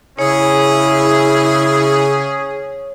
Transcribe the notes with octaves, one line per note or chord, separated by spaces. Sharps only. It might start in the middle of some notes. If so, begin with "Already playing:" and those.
C#3 C#4 E4 G#4 C#5